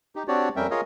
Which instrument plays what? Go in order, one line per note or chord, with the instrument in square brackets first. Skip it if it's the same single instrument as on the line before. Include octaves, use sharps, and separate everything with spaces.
[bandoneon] D#4 G4
C4 D4 F#4 G4 C#5 D5
F2 G3 C#4 A#4 E5 G5
F4 G#4 A#4 C#5 D#5 F5